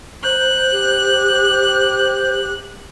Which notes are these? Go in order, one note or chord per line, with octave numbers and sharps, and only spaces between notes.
C5 F#6
G4